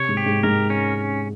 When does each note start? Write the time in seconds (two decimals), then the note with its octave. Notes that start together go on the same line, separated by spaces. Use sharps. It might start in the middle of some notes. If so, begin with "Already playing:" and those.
Already playing: C3 C#5
0.09 G#2
0.17 G4
0.26 G#2
0.43 G#2 A#4
0.70 C#4